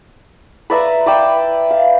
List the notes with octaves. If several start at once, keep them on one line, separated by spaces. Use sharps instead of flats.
B4 D5 E5 A#5
B4 D5 E5 G5
F5